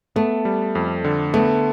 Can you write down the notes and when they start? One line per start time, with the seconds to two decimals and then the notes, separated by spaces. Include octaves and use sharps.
0.16 A3 B3
0.45 G3
0.75 F2
1.04 D3
1.34 A3 B3